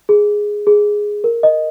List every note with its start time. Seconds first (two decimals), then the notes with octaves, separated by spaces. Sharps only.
0.09 G#4
0.67 G#4
1.24 A#4
1.43 D#5